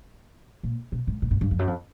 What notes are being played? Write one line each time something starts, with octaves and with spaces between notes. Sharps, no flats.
A#2
B2
G#2
A2
G#2
G2
F2
F#2
F2